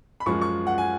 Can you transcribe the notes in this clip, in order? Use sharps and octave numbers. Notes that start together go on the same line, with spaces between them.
B5
F#2 F3 G#3 C#6
C#6
F#5
G#5